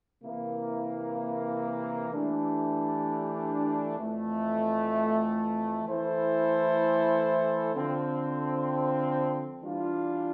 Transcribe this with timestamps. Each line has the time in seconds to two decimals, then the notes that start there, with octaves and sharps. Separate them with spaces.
0.22 C3 E3 A#3 E4
2.09 E3 A3 D4 G4
3.98 F2 E3 A3
5.85 E3 A3 E4 A4 C5
7.73 D3 F3 C4
9.61 E3 G3 D4 F4